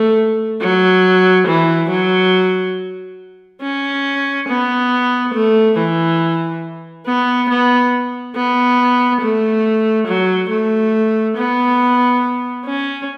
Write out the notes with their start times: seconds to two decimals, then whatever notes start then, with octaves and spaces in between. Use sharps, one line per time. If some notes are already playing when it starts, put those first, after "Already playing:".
Already playing: A3
0.61 F#3
1.47 E3
1.90 F#3
3.62 C#4
4.48 B3
5.34 A3
5.78 E3
7.06 B3
7.50 B3
8.35 B3
9.21 A3
10.07 F#3
10.50 A3
11.37 B3
12.66 C#4